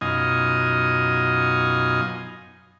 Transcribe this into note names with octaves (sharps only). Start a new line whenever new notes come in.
F#2 B2 D#4 F4 D#5 G#5